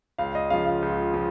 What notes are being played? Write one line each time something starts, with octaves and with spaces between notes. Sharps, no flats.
C#2 F5
D#5
C#3 F3 F5
F5
C#2
F3